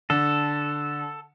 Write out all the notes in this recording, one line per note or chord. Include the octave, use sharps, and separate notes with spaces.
D3 A4